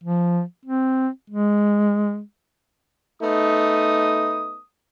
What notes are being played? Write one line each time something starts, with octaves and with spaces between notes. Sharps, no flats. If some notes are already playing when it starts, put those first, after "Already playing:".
F3
C4
G#3
A3 B3 D#4 D#6